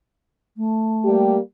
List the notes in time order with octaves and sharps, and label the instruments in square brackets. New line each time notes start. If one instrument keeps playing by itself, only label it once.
[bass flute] A3
[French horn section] G3 A#3 G4